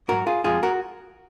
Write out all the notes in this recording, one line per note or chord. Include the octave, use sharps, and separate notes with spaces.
G#2 F#3 F#4 A#4
F4 G#4
F2 F3 G#3 F4 G#4
F#4 A#4